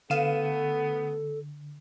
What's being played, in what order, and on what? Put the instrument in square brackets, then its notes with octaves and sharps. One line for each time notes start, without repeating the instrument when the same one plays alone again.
[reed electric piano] D3 [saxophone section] A3 B3 [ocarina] A4 [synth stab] F5 D#7 E7